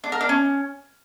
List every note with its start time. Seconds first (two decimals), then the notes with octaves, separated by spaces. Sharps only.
0.04 D4
0.12 A#4
0.21 D4
0.29 C#4